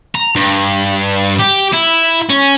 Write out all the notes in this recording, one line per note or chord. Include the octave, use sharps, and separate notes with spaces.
A#5
G2
G4
E4
C#4